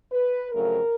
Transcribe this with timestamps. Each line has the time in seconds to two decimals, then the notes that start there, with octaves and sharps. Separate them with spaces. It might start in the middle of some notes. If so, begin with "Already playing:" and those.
0.12 B4
0.52 F2 C#3 F#3 A3 A#4